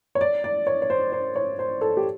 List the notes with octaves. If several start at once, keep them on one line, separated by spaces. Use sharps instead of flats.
C#5
D5
D5
C#5
C#5
C5
C5
C#5
C5
A4
G4